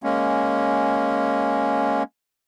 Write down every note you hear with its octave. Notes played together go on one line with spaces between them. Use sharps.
G#3 A#3 C#4